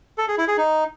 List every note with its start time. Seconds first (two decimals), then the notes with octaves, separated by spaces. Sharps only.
0.18 A4
0.28 G#4
0.38 E4
0.48 G#4
0.58 D#4